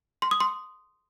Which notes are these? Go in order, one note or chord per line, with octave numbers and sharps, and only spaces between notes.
C6
D#6
C6